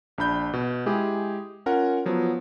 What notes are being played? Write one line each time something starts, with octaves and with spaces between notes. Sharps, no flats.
A#1 D4 B5 G6
B2
G#3 E4 G4 G#4
C#4 F4 A#4 F#5
F3 F#3 B3